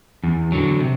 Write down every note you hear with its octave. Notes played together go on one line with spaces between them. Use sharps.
E2
D3 F#3
C3